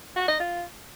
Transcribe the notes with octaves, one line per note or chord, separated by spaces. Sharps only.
F#4
D#5
F4